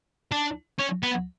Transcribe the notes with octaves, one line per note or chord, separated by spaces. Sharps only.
D4
C#4
B3